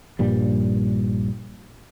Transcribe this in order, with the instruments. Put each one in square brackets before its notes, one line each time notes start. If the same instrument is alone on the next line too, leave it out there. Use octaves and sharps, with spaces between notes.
[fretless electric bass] A#1 G2 A#2 G3